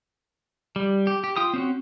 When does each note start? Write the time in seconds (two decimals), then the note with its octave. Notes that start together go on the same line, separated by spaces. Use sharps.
0.76 G3
1.07 G4
1.24 G4
1.37 F4 G5 D#6
1.54 C4 C#4 F#4